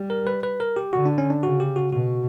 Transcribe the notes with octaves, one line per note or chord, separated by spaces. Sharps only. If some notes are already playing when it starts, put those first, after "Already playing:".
Already playing: G3
A#4
B4
B4
A#4
G4
D3 F#4
D4
C#4
D4
C#3 F#4
G4
F#4
B2 F#4